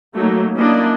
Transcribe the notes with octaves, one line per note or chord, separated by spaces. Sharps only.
F#3 A3 A#3 D#4
A#3 C#4 D4 E4 D#5